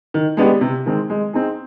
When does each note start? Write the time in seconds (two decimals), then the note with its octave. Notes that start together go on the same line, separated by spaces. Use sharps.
0.14 D#3
0.37 G#3 B3 D4 G4
0.61 C3
0.86 D#3 G#3 C4
1.10 G#3
1.33 C4 D#4 G#4